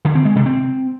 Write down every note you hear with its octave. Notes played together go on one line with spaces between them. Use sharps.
D3
C4
G#3
C3
C4